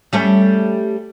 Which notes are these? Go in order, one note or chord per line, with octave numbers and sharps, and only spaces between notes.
G3 A3 C#4